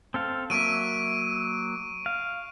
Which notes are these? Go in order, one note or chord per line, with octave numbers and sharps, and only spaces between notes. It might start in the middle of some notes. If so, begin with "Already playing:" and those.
C4 A4 F5
F#3 A#3 E5 C#6 D7 D#7
F5